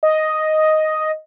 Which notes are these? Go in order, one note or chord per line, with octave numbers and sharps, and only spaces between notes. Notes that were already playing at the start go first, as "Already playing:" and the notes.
D#5